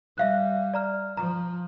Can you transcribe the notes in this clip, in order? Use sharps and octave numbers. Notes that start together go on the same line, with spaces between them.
G3 E5 F5 F#6
D5 A#5 F6
F3 A#5